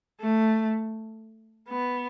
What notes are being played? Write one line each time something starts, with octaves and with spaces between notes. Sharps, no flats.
A3
B3